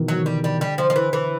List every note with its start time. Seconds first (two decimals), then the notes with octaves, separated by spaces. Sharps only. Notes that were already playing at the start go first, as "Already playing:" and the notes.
Already playing: B2 D#3 E3
0.08 F#3
0.18 D3
0.26 D#3 G3
0.44 G3
0.61 D3 G3
0.78 F3
0.90 F3
0.96 E3
1.13 E3